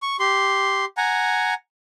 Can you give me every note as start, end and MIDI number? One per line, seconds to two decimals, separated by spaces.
0.02 0.16 85
0.19 0.85 67
0.19 0.85 84
0.97 1.54 78
0.97 1.54 80
0.97 1.54 82